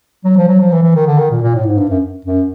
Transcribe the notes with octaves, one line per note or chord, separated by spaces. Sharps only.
F#3
F3
F#3
F3
E3
E3
D#3
D3
D#3
A#2
A#2
A2
G#2
G2
F#2
F#2